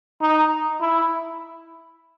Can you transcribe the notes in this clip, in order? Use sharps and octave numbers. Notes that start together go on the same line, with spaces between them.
D#4
E4